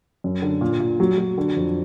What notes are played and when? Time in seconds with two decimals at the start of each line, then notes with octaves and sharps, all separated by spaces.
0.24 F#2
0.42 D3
0.61 A#2
0.80 A#2
1.00 F#3
1.18 F#3
1.38 D3
1.56 F2